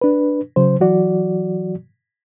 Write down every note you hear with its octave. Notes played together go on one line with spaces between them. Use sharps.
D4 B4
C#3 F#3 C5
E3 F#3 F#4 D5